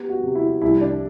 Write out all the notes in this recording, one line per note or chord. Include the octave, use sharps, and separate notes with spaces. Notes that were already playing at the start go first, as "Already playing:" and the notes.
Already playing: B3 G4
F#4
C3
E4
C2 E4
D4